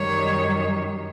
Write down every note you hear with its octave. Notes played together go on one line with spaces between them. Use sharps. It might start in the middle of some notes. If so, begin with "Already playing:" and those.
Already playing: F#2 D#3 G3 C#5